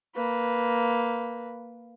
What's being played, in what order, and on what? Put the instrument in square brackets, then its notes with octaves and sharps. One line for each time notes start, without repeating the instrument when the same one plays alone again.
[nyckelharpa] A#3 B4